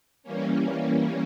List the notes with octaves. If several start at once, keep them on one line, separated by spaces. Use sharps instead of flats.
E3 G3 A#3 C#4